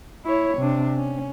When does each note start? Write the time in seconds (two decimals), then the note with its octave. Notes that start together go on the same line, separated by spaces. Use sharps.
0.25 E4 C#5
0.58 C3 D4
0.97 C#4